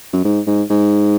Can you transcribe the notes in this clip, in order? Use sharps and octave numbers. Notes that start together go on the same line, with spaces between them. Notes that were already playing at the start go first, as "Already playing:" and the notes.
F#2
G#2
G#2
G#2